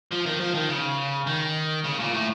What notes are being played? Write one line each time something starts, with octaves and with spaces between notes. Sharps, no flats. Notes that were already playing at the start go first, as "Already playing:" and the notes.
F3
D#3
F3
D#3
C#3
D#3
C#3
A#2
A2